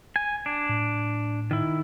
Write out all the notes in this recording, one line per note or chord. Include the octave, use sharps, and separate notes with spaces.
G#5
D4
A2
D#3 E4